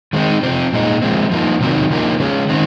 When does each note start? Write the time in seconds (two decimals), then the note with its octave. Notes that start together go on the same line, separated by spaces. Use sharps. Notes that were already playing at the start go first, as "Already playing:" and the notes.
0.13 D#3 G#3 C4 D#4
0.43 C3 F3 C4
0.73 A#2 G#3 D#4
1.02 F3 G#3 C4
1.31 F3 A#3 D#4
1.61 C3 D#3 F#3 C4 D#4
1.90 C#3 F3 A#3 D#4
2.20 C#3 F3 G#3 C#4
2.49 D#3 G#3 C4